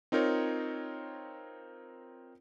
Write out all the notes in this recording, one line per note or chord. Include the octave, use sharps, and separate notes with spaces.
C4 D#4 F4 A#4 C#5